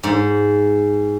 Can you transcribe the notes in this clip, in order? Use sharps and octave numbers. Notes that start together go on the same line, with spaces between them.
G#2